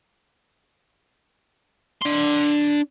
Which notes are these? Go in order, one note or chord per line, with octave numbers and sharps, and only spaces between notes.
D4 C6